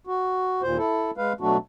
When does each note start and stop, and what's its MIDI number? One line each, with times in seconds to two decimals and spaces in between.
0.07 0.62 66
0.62 0.77 39
0.62 0.77 46
0.62 0.77 72
0.78 1.11 64
0.78 1.11 69
1.17 1.33 56
1.17 1.33 71
1.17 1.33 77
1.41 1.57 47
1.41 1.57 54
1.41 1.57 57
1.41 1.57 62
1.41 1.57 66